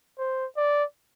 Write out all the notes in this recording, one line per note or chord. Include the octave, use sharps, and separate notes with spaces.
C5
D5